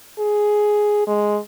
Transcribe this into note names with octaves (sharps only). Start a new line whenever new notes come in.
G#4
G#3